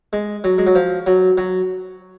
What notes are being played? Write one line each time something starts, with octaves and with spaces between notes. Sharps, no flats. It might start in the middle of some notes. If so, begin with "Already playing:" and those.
G#3
F#3
G#3
F#3
F3
F#3
F#3